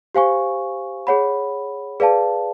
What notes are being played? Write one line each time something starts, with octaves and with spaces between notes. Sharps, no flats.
G4 C5 F5 G#5 C#6
G#4 C#5 F#5 B5
G#4 B4 D5 F5 A5